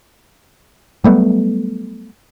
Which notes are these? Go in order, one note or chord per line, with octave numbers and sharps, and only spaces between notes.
F#3 G3 A3 B3